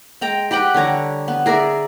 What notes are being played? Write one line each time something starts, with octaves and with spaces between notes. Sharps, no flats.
G#3 G5 A#5
G4 B4 F#5 G5
D3 G3 C#5 A#5
B3
G#4 A#4 D5 E5